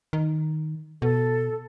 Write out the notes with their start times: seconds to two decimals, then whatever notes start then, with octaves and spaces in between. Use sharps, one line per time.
0.13 D#3
1.02 B2 A4